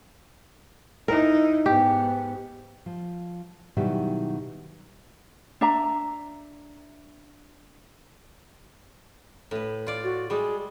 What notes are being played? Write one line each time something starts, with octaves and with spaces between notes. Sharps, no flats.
D#4 E4 A#4
G#2 B3 G4
F3
B2 D#3 F#3 G3 E4 G4
D4 E5 A#5
A2 B4
F4 D5
F#4
G3 G#3 G#4